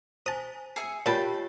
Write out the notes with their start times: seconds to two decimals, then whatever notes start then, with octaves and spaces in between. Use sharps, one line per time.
0.26 C5 G#5 A5 D#6
0.76 G#4 E5 G#5 C7 C#7
1.06 A#2 F4 G4 C#5 G5 A5 B5